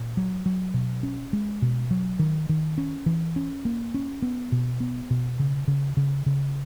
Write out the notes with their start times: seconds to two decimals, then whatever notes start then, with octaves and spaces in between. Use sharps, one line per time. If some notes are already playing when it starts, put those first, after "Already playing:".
Already playing: A#2
0.17 F#3
0.46 F#3
0.74 B2
1.03 C#4
1.33 G#3
1.62 B2
1.91 F#3
2.19 D#3
2.49 D#3
2.78 C#4
3.06 E3
3.36 C#4
3.65 A#3
3.94 C#4
4.22 B3
4.52 B2
4.80 B3
5.10 B2
5.39 C#3
5.68 C#3
5.97 C#3
6.26 C#3